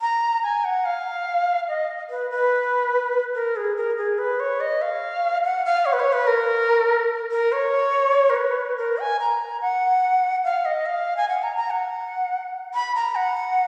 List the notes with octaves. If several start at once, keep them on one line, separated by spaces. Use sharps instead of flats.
A#5
G#5
F#5
F5
D#5
B4
B4
A#4
G#4
A#4
G#4
B4
C#5
D#5
F5
F#5
F5
C#5
B4
C#5
B4
A#4
A#4
C#5
A#4
B4
A#4
G#5
A#5
F#5
F5
D#5
F5
G#5
F#5
A#5
A#5
F#5
B5
A#5
F#5